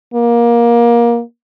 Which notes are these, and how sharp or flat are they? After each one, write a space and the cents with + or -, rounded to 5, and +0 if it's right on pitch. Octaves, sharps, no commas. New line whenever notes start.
A#3 +20